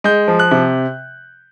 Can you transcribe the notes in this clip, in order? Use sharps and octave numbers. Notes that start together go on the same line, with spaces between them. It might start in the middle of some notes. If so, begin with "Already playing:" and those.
G#3 G6
F3
F#6
C3